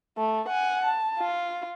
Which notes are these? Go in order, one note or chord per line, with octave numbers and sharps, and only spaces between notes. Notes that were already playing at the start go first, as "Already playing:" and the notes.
A3
F#5 G#5
A5
F4